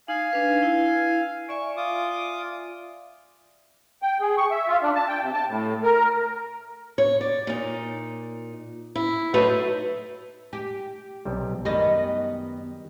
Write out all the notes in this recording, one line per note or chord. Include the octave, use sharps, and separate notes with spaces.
D#4 F5 G#5
D4 B4
E4
D5 E5 G#5 C#6
F4 D6 D#6
G5
G#4
C#6
E5
F4
D4
A5
G5
C3
A5
A2
A#4
C#5
D5
A#2 D#4
E4
F#3 A3 D#4 B4 C5 E5
G4
B1 C3 G3
F#2 D#3 G3 B3 D#5